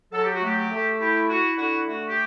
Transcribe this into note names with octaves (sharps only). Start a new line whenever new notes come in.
F#3 A4
G4
F#4
A3 G4
G4
A3
E4 G4
E4 F#4
D3 F#4
A3 F#4
G4